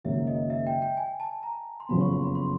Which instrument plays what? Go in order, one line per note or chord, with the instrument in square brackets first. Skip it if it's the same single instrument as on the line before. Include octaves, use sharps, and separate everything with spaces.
[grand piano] G#1 F#2 C#3 F#3 A#3 [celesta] E5
[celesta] D#5
E5
G5
G5
G#5
A5
A#5
C6
[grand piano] F#1 F2 C#3 F#3 B3 [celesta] B5
[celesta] C#6
C6
B5
C6